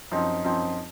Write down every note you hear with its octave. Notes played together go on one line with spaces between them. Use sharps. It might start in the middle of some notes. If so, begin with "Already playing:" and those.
F#2 F3 C4 D#4
F#2 F3 C4 D#4